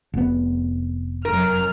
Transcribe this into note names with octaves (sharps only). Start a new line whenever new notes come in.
F1 B3
F#2 A#4 F6